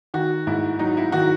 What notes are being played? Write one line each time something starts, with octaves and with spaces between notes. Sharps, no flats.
D#3 F#4
G#2 E4
F#3 D#4
E4
D#3 F#4